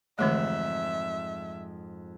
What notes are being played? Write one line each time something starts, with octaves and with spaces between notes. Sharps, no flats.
F2 G#2 D3 E3 A3 E5